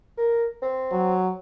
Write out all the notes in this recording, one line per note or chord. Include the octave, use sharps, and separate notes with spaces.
A#4
C4
F#3